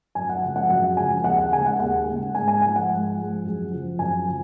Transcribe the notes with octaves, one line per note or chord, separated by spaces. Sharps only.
F#2 G#5
F#5
C#3 F3 G#3
F#5
F#2 F#5
C#3 F3 G#3 G#5
D#2 F#5
F#5
C#3 G#3 G#5
F#5
D#2 F#5
C#3 G#3
G#2 G#5
G#5
F3 G#3 G#5
F#5
G#2
F3 G#3
F#2
C#3 F3
F#2 G#5
C#3 F3